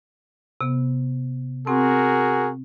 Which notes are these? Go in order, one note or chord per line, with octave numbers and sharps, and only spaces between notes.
C3 B3
C4 F#4 G#4 A#4